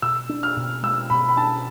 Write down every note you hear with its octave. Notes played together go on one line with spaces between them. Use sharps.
B2 E6
D4
F6
B2
G#3 E6
B2 B5
B5
D4 A5